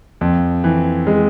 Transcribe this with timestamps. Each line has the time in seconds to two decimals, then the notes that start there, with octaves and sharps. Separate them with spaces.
0.21 F2
0.64 E3
1.07 G#3